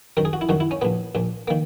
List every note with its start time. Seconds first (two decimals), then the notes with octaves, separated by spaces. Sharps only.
0.17 F#2 D#3 A#4
0.25 G#4
0.33 F#4
0.41 E4
0.49 F#2 D#3 F#4
0.60 E4
0.71 C#4
0.82 A#1 A#2 B3
1.15 A#1 A#2
1.48 D#3 A#3